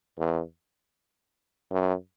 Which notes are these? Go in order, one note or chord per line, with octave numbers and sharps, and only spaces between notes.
E2
F#2